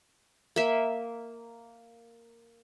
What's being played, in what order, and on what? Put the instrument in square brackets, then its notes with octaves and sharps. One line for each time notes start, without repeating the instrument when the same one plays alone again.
[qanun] A#3 E5